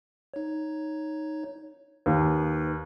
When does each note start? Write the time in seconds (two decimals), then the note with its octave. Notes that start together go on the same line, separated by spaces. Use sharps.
0.34 D#4 C#5
2.06 D#2 B4